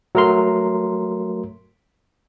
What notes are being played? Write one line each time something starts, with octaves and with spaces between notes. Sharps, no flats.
F#3 A3 A#4 A#5 C6